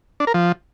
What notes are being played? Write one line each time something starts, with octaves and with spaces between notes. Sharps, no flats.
D4
A#4
F3